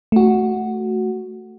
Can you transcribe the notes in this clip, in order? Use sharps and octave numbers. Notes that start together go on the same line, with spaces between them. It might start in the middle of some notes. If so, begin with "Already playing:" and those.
A3 F#4